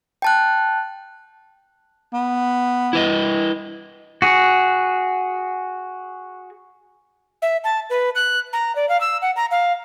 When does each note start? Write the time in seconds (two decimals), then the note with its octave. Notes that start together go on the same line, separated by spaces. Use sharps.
0.22 G5 A5 F#6
2.13 B3
2.93 E4 B4 D#5
4.22 F#4 G#4
7.42 E5
7.64 A5
7.90 B4
8.15 F#6
8.53 A#5
8.76 D5
8.89 F5
9.01 E6
9.22 F#5
9.36 A#5
9.51 F5